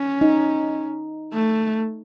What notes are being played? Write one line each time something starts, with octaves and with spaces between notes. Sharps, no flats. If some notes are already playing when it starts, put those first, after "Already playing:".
Already playing: C#4
D#4
A3